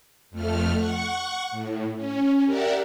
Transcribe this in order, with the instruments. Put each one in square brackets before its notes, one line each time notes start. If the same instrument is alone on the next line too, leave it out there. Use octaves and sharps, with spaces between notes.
[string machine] F2 A3 F6
F#5 C#6
A2
C#4
G4 A#4 D5 E5 F#5